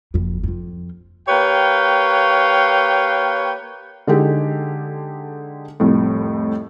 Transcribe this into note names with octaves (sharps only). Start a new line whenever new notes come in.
F#1 F2
F2 F4
A#3 G4 B4 C#5 F5 G5
D3 G#3 D#4 G4 A4
C2 F2 A2